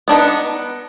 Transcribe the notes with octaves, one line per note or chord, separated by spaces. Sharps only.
B3 D4 D#4 B4